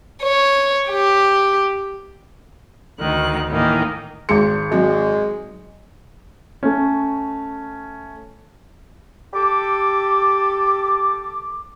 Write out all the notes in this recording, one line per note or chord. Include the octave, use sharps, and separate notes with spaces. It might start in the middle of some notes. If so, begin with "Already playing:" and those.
C#5
G4
D2 D#3 F#6
A2 D#3 E3 A#3
G#1 G#3 G#4 C6 C#7
F#3 G#3 C4 F#4
A3 C#4
G4 A4 D6